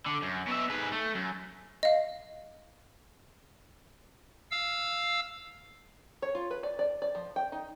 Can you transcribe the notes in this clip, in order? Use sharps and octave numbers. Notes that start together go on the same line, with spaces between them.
D3
F#2
B2 E5
G#2 B4
A3
F#2
D#5 F5
F5 E6
C#5
F4
B4
D5
D5
D5
F3
G5
D#4